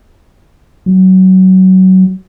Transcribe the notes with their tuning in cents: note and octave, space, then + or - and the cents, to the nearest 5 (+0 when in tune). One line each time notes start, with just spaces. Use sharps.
F#3 +20